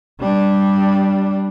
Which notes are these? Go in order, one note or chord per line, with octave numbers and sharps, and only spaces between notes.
G3 D4